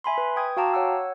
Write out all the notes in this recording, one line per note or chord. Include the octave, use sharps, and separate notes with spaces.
E5 G#5 B5 C6
B4
G5 D#6 G#6
F#4 F5 G5 A5 A#5 D6
C#5 F#5 E6